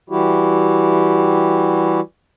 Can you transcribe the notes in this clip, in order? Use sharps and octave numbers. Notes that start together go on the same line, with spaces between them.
E3 G3 E4 F#4 G4